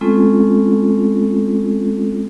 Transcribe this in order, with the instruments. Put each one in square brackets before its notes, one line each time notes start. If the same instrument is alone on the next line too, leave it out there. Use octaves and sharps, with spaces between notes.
[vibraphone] G#3 A3 C4 C#4 F4 A4